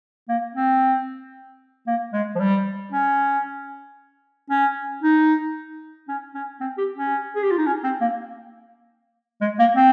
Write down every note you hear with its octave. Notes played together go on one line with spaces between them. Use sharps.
A#3
C4
A#3
G#3
F3
G3
C#4
C#4
D#4
C#4
C#4
C4
G4
C#4
G#4
G4
F4
D#4
C#4
C4
A#3
G#3
A#3
C4